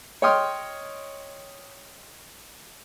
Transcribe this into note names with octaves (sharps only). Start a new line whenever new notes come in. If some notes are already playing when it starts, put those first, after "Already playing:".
C#5 D#5 G5 C6 D#6 F6